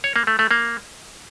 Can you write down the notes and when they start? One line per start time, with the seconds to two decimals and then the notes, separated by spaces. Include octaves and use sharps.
0.04 C#5
0.16 A#3
0.27 A3
0.39 A3
0.51 A#3